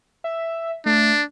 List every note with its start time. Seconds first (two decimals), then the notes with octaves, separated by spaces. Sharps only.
0.24 E5
0.86 A3 D4